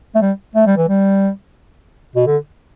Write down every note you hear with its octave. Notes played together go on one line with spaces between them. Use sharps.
A3
G3
A3
G3
E3
G3
B2
D3